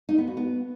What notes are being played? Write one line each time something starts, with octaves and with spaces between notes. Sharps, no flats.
D#4
B3
F#4
B3